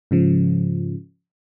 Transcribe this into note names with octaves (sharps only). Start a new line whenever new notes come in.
G#2 C#3 F3